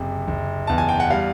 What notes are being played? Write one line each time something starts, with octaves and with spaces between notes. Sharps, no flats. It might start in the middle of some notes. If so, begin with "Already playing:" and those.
Already playing: F#1 C3
F#1
E2 A5
G#5
G5
F#5
G3 F5